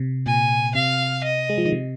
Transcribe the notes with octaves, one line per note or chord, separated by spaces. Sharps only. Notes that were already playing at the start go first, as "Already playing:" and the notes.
Already playing: C3
A#2 G#5
C3 F5
D#5
G#3
F3
D#3
C3